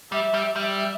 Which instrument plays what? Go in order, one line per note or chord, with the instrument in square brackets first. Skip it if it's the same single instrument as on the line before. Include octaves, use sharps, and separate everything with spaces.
[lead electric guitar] G3 [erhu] E5
[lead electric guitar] G3
[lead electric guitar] G3 [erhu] E5